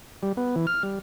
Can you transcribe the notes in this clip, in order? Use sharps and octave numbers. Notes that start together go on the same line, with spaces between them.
G3
B3
E3
F6
G3